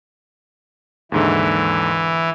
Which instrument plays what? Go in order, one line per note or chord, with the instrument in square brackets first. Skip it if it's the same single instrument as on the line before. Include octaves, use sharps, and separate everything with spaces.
[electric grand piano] D#2 G#2 D3 [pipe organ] E3